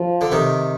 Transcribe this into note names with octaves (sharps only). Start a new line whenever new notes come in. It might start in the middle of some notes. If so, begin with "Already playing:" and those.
Already playing: F3
D3
C3 D#3